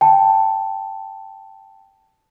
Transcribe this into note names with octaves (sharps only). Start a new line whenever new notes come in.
G5 A5